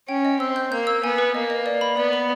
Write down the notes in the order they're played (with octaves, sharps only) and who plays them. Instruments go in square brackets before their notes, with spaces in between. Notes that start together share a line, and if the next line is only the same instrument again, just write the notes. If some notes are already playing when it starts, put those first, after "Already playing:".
[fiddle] C#4 [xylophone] G5
[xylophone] D#5
[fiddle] C4 [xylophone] E6
[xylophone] G6
[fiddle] A#3 [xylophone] G6
[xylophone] E6
[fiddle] B3 [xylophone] G#5
[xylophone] B4
[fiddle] A#3 [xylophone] D#5
[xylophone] D#5
D5
B5
[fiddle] B3 [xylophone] D5
[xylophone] B5